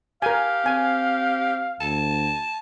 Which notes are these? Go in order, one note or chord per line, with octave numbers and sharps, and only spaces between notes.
G4 A#4 F5 G#5
C4 G#5
D2 A5